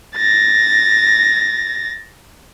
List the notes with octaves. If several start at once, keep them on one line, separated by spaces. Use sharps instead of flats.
A6 A#6